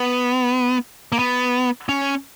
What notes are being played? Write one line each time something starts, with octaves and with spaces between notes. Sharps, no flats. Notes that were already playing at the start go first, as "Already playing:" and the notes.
Already playing: B3
A#3
B3
C#4